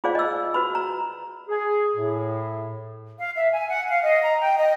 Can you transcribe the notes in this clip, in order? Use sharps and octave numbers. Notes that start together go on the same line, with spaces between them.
F4 G#4 C5 D5 F5
D#5 E6
F#4 B4 B5
A#5
G#4
A2
F5
E5
G#5
F#5
F5
D#5
A#5
G5
D#5